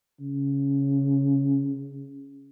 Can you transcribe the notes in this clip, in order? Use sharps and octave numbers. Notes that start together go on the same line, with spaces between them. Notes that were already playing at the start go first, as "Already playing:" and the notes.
C#3